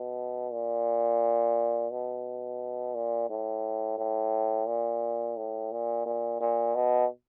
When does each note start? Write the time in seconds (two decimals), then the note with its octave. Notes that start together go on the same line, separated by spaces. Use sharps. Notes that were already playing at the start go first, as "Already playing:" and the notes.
Already playing: B2
0.52 A#2
1.91 B2
2.95 A#2
3.29 A2
3.98 A2
4.67 A#2
5.37 A2
5.72 A#2
6.06 A#2
6.41 A#2
6.75 B2